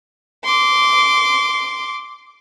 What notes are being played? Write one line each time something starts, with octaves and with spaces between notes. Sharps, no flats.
C6 D6